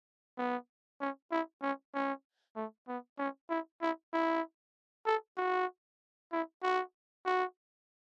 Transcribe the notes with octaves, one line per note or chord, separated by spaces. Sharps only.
B3
C#4
E4
C#4
C#4
A3
B3
C#4
E4
E4
E4
A4
F#4
E4
F#4
F#4